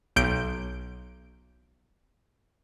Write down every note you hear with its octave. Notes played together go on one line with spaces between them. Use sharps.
B1 G6 D7